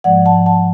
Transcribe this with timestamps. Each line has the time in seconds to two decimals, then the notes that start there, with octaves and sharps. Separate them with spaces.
0.04 G#2 F3 G#3 D5 F#5
0.26 F#5 A5
0.46 F#5 A5